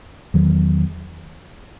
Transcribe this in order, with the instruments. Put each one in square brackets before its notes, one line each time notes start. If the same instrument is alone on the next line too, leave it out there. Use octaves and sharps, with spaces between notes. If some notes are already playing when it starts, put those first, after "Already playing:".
[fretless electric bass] E2 D#3 F#3